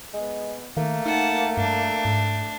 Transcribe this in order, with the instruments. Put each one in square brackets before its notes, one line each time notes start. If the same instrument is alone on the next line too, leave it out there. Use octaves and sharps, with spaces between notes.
[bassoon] G#3 [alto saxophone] B3
[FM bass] D#3 [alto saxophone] A3 [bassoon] A#3
[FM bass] D#4 [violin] F#5 A5
[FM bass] G2 [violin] D4
[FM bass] G#2